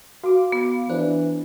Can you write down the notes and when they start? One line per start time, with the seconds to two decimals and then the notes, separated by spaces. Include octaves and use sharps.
0.23 F#4 F5 D6
0.52 B3
0.90 E3 D4 C5